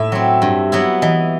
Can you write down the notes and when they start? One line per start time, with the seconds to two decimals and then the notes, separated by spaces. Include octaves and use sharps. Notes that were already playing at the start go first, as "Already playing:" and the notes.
Already playing: A2 A3 E4 E5
0.12 F#3 C4
0.42 G2
0.72 F#3 B3 E4
1.02 E3 D#5